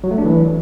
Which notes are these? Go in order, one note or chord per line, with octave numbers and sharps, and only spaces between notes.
F#3
A3
D4
E3